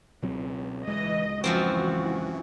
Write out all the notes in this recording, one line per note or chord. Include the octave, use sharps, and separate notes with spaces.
C#2 B2 F#3 C4
D1 C#2 E3 G#3 D#5
F#2 E3 F3 C4 F#4